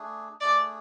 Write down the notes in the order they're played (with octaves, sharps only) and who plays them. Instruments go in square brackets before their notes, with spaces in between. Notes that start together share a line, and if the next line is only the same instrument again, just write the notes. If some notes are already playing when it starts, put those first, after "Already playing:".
Already playing: [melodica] A3 D4 G#4
[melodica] A3 D4 G#4 [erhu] D5